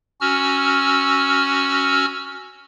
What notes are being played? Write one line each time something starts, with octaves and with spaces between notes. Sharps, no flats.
C#4 F#4 E6 F6